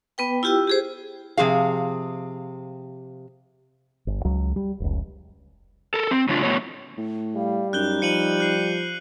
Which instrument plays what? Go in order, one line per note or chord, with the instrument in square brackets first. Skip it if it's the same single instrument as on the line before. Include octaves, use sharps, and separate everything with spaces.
[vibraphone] B3 B4 G5
E4 F4 G4 G5 E6
G4 G#4 C5
[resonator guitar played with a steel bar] C3 F3 G#4 F5
[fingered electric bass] G1
C#2 F#3
G3
F1 C#2
[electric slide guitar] A4 A#4
C4
A2 C#3 F#3 D4 F4
A2 F#3 B3 C#5
[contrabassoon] A2
[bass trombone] G3 [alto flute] F5
[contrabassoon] F#2 [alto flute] D#4 [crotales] F#6 G6 G7
[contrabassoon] F3 [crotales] C#7 D#7 F#7
[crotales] F#6 C7